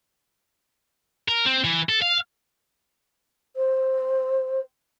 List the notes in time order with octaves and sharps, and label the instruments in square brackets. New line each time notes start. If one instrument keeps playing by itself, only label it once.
[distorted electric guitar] A#4
C4
E3
A4
F5
[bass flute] C5